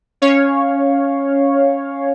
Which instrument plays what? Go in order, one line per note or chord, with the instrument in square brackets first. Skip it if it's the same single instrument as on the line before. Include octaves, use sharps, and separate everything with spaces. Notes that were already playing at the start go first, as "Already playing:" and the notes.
[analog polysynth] C#4 C#5 F5